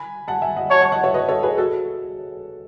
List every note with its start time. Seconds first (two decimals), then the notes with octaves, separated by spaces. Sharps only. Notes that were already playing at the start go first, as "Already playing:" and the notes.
Already playing: G#5 B5
0.28 F#5 A5
0.42 E5 G#5
0.57 D#5 F#5
0.70 C#5 F#5 A5
0.81 F#5 A5
0.92 D#5 F#5
1.04 C#5 E5
1.14 B4 D#5
1.29 A4 C#5
1.43 G#4 B4
1.57 F#4 A4